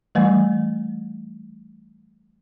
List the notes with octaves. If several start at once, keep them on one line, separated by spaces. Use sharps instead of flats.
E3 G3 A3